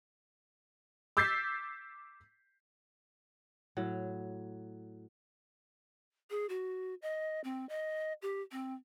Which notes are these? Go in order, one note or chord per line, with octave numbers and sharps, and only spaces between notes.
D6 E6 G6 A6 B6 C7
A2 F#3
G#4
F#4
D#5
C4
D#5
G4
C4